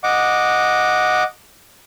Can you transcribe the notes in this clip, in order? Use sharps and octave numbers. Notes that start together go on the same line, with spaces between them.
D#5 F#5 D6